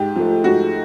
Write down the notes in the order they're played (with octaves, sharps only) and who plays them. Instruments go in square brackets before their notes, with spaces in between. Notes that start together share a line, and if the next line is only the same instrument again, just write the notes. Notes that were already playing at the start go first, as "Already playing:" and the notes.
Already playing: [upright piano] G#2 G4
F3 A3
G#2 F#4